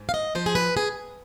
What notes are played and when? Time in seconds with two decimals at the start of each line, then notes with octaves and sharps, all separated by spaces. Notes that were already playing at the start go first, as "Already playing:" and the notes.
Already playing: G#2
0.09 F5
0.14 D#5
0.35 F3 C5
0.46 G#4
0.55 B4
0.77 G#4